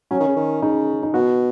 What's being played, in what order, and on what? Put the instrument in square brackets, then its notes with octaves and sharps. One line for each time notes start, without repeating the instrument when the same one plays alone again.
[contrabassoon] F#3 [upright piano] C#4
[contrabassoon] D#3
C#3
D#3
[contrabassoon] C#3 [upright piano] D#4
[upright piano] D#4
[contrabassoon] B2 [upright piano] F#4